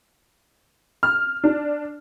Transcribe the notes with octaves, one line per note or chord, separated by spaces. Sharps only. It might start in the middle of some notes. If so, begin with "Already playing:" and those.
F6
D4